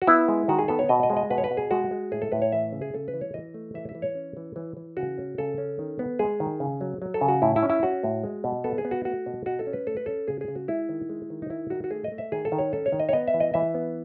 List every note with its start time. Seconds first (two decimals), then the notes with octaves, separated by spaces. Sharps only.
0.02 F#4
0.07 B3 E4
0.28 G#3
0.48 D#3 F#4
0.59 G#4
0.68 B3 A4
0.79 C#5
0.89 B2 D#5
1.03 D#5
1.10 G#3
1.17 D#5
1.30 B2 B4
1.38 C#5
1.44 B4
1.51 B2
1.57 G#4
1.71 G#3 F#4
1.91 G#3
2.12 A2 G#4
2.22 A4
2.32 A2 B4
2.42 C#5
2.52 E3 E5
2.73 C#3
2.82 G#4
2.94 C#3 A4
3.08 B4
3.14 E3
3.21 C#5
3.34 E3 D#5
3.54 A3
3.74 E3 E5
3.89 E5
3.95 E3
4.02 C#5
4.15 C#4
4.37 E3
4.56 E3
4.77 E3
4.97 C#3 F#4
5.18 C#4
5.38 C#3 A4
5.58 C#4
5.79 D#3
5.99 B3
6.19 G#3 G#4
6.40 D#3
6.60 C#3
6.81 F#3
7.02 F#3
7.14 A4
7.21 C#3
7.28 F#4
7.42 A2 E4
7.56 E4
7.63 C#4
7.70 E4
7.83 C#4 F#4
8.04 A2
8.24 G#3
8.44 B2
8.64 B3 A4
8.78 G#4
8.85 B3
8.91 F#4
9.05 A3 F#4
9.26 B2
9.46 B2 F#4
9.59 A4
9.67 C#4
9.73 B4
9.87 A3 A4
9.97 B4
10.06 C#4 A4
10.28 C#3 G#4
10.41 G#4
10.48 C#3
10.55 F#4
10.68 G#3 E4
10.89 D#3
11.09 G#3
11.30 D#3
11.42 D#4
11.50 D#3 E4
11.70 D#3 F#4
11.84 F#4
11.91 A3 G#4
12.04 D#5
12.12 A3
12.18 E5
12.32 D#3 G#4
12.45 A4
12.52 D#3
12.58 C#5
12.73 C#4 A4
12.86 C#5
12.92 D#3
13.00 D#5
13.09 C#5
13.13 B3 D#5
13.28 E5
13.34 E3
13.40 D#5
13.54 E3 E5
13.75 B3